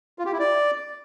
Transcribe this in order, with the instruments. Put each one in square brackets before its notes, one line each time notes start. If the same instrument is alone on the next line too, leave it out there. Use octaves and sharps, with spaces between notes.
[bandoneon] F4
G4
E4
D5